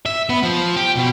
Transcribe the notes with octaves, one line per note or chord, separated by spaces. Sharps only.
E5
B3
F3
G4
B2